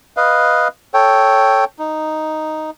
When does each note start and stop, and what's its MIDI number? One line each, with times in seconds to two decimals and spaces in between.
0.17 0.68 71
0.17 0.68 75
0.17 0.68 77
0.94 1.64 69
0.94 1.64 73
0.94 1.64 79
1.79 2.71 63